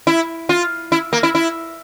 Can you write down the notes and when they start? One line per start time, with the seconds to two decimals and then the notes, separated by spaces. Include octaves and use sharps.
0.07 E4
0.49 F4
0.92 E4
1.13 A#3
1.23 E4
1.35 E4